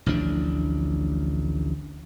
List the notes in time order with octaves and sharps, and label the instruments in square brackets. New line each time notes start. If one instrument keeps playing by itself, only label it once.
[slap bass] A1 D2 F3 D4